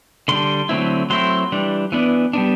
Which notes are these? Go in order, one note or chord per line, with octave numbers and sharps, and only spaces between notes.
D3 G3 D4 C6
D3 F#3 A3 C4 E4
F#3 A3 C4 E4 C6
E3 G3 D4
E3 B3 D4
G3 B3 D4